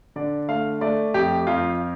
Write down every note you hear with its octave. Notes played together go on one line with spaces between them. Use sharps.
D3 D5
A3 F5
A3 D5
F2 G4
F2 F4